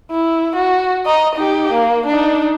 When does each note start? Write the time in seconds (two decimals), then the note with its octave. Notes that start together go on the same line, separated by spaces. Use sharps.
0.11 E4
0.56 F#4
1.06 D#5 A#5
1.36 D#4 G4
1.72 A#3
2.07 D4 D#4